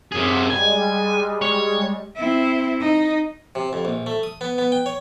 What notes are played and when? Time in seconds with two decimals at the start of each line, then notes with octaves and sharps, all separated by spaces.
0.12 F#2 C3 G#4
0.50 G3 G#3 G#5
1.42 C#5
2.16 C4 E4
2.80 D#4
3.55 C3
3.73 F2
3.85 A#1
4.06 A3
4.23 D#6
4.41 B3
4.58 B3
4.72 G5
4.86 C#5